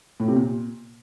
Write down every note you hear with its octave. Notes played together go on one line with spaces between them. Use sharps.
A2
C3
A#2